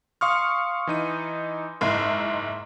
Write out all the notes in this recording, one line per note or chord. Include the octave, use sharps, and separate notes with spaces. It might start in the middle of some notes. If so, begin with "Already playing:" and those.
F5 C6 C#6 D#6 F6 C#7
E3 D#4 D#7
F#1 G#2 E4 D#5 C6 C7